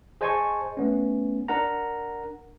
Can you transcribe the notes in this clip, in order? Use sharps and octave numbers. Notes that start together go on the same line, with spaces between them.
G#4 C5 D#5 G#5 A5 C#6
A3 B3 C#4
D4 A#4 F#5 A#5